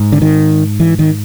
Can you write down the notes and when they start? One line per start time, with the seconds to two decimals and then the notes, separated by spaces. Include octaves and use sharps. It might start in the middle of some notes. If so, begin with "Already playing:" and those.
Already playing: G#2
0.12 D3
0.22 D#3
0.80 E3
0.99 D#3